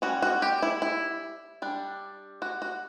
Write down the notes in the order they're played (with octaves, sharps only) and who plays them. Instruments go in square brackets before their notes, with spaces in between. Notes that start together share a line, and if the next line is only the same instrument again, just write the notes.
[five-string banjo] G3 C#4 F#4
F#4
G4
E4
E4
G3 D4
F#4
F#4